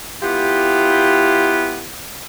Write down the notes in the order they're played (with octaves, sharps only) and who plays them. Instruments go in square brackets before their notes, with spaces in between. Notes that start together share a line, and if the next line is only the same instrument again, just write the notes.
[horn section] B3 E4 F4 G4